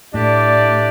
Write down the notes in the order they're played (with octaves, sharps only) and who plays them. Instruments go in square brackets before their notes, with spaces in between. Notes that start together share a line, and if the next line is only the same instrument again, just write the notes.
[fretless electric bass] A2 [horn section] A3 D4 G4 D5